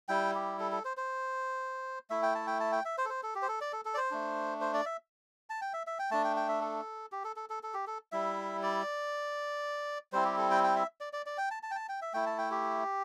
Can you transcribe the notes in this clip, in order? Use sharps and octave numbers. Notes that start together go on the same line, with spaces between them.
G3 E4 G5
G4
A4
A4
C5
C5
A3 E4 E5
G5
A5
G5
A5
G5
E5
C5
A4
C5
A4
G4
C5
A4
D5
A4
A4
D5
C5
A3 D4
C5
D5
E5
A5
G5
E5
E5
G5
A3 D4 A5
G5
G5
E5
A4
G4
A4
A4
A4
A4
G4
A4
G3 E4 E5
D5
G3 C4 E4 C5
G4
A4
G5
G5
E5
D5
D5
D5
G5
A5
A5
G5
A5
G5
E5
A3 E4 G5
A5
G5
G4